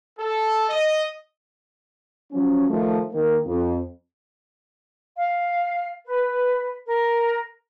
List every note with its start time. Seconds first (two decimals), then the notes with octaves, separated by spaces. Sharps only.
0.19 A4
0.69 D#5
2.32 F3 F#3 C#4
2.69 D#3 F3 A3
3.12 D#3 A#3
3.45 F2
5.16 F5
6.06 B4
6.85 A#4